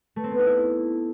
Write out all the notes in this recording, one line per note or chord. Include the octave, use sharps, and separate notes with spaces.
A3
C4
B3
D#4
E4